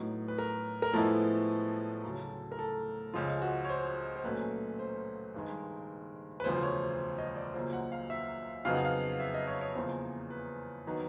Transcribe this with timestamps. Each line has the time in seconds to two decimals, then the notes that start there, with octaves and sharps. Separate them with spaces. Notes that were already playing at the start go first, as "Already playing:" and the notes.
Already playing: A2 F#3 B3 D#4
0.28 B4
0.38 A#4
0.82 A#4
0.93 A2 F3 G#3 B3 E4 A4
2.04 D2 C#3 F#3
2.52 A#4
2.59 A4
3.14 C#2 C#3 F3 G#3 F4
3.42 F#4
3.65 C#5
3.69 C5
4.16 C5
4.24 A#2 F#3 A3 C#4 B4
4.79 C5
5.34 G2 D#3 G#3
6.40 B4
6.44 E1 D2 C#3 F3 C5
6.63 C#5
7.18 D#5
7.36 D5
7.54 C#2 C#3 F#3 A#3 C5
7.73 F#5
7.92 F5
8.10 E5
8.65 F2 C#3 F#3 B3 D#4 F5
8.75 F#5
8.85 F5
9.20 E5
9.34 D#5
9.47 C#5
9.61 C#5
9.75 E2 C#3 F3 A#3 C5
10.30 B4
10.87 D#3 F#3 B3